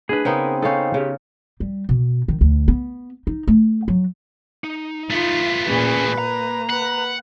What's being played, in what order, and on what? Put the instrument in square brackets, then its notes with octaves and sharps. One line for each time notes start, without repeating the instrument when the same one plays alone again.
[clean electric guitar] A2 D4 [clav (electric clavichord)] G#4 B4
[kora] C#3 B3 D#4 [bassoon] C4 [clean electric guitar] A#4
[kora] C#4 A4 [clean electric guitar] D#4 C5 F5
[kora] C#3 [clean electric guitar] C#4 G4
[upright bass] G3
B2
D#3
D2
B3
D#4
A3
F#3
[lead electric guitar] D#4
[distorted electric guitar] A3 B3 [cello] F4
[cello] A#2 G#4 [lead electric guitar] C#4 [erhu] B4
[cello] A#3 [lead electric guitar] A#5
[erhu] B4 [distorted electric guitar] F#5